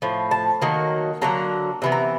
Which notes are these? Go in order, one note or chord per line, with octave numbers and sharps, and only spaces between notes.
A2 F3
A5
D#3 F#3 A#3
D3 F#3 A#3 A#5
C3 E3 B3
A#5